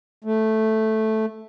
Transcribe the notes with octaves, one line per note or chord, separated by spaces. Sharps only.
A3